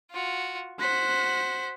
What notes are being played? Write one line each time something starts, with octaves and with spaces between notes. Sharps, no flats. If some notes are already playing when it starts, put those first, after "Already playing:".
F4 F#4
F#4 C5 F#6 B6